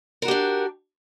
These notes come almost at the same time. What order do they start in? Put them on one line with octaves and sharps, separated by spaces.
A#4 F#4 G4 D4